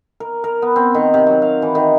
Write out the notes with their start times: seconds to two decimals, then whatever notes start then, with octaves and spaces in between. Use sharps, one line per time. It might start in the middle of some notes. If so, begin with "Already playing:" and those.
0.20 A#4
0.44 A#4
0.62 B3
0.76 C4
0.94 D#3
1.14 C3
1.27 F#3
1.42 F5
1.62 E3
1.75 D#3